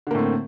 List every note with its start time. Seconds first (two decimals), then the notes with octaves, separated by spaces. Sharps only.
0.07 D3
0.11 A#3
0.15 A2
0.19 C4